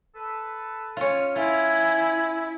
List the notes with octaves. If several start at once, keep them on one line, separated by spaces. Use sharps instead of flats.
A4 B4
C#4 F4
E4 F4 G#5